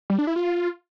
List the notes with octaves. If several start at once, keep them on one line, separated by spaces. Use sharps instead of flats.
G3
D4
E4
F4